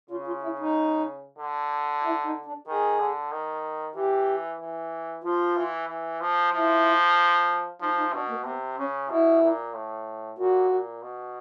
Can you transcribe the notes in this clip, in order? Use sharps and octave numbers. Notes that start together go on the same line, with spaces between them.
C#3 F4
F4
E4
D#4
D3
E4
D#4
D4
D#3 G#4
D3
D#3
E3 G4
E3
F3 F4
E3
E3
F3
F3 E4
F3 D#4
D#4
B2 D4
A#3
C3 B3
C#3 C#4
B2 E4
A#2
A2
A#2 F#4
A#2
B2